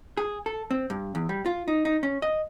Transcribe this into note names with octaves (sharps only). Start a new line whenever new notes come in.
G#4
A4
C4
G2
E2
G3
F4
D#4
D#4
C#4
D#5